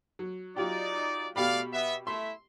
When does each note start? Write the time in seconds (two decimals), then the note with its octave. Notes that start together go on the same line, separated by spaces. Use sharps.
0.19 F#3
0.57 F#3 D#4 F4 G4 D5
1.36 B2 A3 G4 D5 F5 B5
1.73 B3 E5
2.07 A3 E4 E5 C6